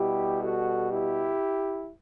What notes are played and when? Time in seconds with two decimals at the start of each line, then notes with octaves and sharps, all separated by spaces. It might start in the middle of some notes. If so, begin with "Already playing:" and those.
Already playing: B2 G3 E4 G4
0.43 F#4 A4
0.90 E4 G4